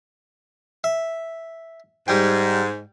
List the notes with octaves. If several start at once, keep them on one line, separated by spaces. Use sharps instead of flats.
E5
G#2 G3 G5